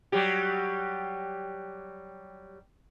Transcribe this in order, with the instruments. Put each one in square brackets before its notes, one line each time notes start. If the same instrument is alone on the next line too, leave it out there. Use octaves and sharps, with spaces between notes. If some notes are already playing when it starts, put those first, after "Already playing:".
[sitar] F#3 G3 G4